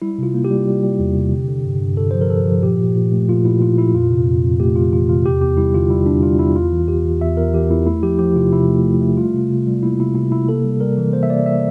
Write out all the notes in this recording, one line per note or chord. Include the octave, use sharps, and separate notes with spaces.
G3 E4
C3 F4
A#3
G4
G3
G3
G3
E2
C3
D3
D3
G2
G2
D3 A4
F3 C5
A#4
G2 A4
F3
A#2 G4
A#2
A#2
A3
A#2 F4
A#2 E4
A#2 F4
A#2 E4
F2 F4
C3
F2
F2
A3 G4
F2 F4
E3 F4
C3 F4
E2 G4
E2 G4
G3 E4
D3 F4
G3 E4
G3 D4
G3 F4
E2 E4
E2 F4
E3
E2 G4
E2
E2 E5
E2 A#4
E3 G4
E2 E4
A3 E4
F3 G4
F3 G4
C3 F4
C3 E4
A3
A3
A3
G3 F4
C3
C3
G3
A#3 E4
C3 E4
C3 E4
C3 E4
A#3 A4
G3
G3 A#4
E3
A#3 C5
E5
A#3 D5
E5